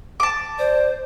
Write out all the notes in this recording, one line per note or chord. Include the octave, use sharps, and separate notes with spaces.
A5 D6
C5 D5